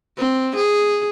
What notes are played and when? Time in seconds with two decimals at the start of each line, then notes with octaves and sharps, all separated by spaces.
0.17 C4
0.56 G#4